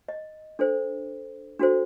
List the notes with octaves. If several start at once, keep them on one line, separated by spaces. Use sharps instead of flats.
D#5
D4 A4 C5
D4 F#4 A4 C5